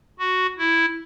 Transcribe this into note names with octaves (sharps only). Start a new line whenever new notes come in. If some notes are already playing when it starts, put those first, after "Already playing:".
F#4
E4